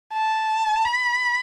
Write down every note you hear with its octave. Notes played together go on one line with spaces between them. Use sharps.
A5
B5